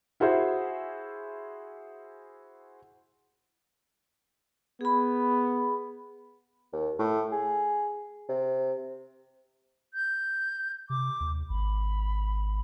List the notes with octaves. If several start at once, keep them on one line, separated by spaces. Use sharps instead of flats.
E4 F#4 G#4 C5 E5
B3 G#4 B5
D#2
A2
G#4
C3
G6
C3 D6
D#2
G#1 B5